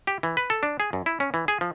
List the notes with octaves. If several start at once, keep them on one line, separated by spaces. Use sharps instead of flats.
G4
E3
B4
A4
D4
G#4
F#2
E4
C#4
E3
G#4
F3